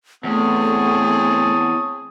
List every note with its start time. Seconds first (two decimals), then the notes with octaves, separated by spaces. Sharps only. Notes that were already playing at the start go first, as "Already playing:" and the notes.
0.24 E2 A3 C4 G#4 C#5 A5 D#6